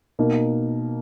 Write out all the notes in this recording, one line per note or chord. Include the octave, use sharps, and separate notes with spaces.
B2 A#3 D#4